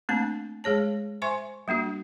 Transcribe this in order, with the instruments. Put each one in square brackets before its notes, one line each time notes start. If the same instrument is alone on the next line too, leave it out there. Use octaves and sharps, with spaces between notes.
[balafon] A3 A#3 C4 D4 A5
G#3 G#4 C#5 A5
C5 E5 G#5 C6 C#6
G3 A#3 D4 F#4